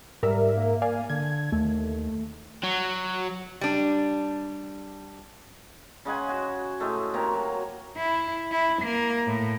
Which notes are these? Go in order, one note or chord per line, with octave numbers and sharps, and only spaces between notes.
G#2 G3 A#4 E5
A#3
D5 F5 G#5
D3 G#6
D#2 A3
F#3
G3 D4
C#3 G#3 F#5 G#5
F#4
A2 G#3 A3
C3 A#3 C#5 A#5
F#3
E4
E4
A#3
A2